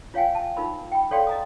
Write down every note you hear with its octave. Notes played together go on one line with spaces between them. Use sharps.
F4 C#5 F5 G5 G#5
A5
D#4 F4 A#4 B5
G5 B5
A4 C#5 D5 F5 G5 C6
D#5 A#5 D#6